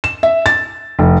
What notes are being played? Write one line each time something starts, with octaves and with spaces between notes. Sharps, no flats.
E7
E5
A6
F1